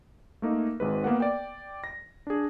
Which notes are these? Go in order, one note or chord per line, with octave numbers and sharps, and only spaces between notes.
A3 A#3 D#4
G#1 G#2 B4
A#3 B3 A#4 F#5
D5 G5
A#6
D4 G#4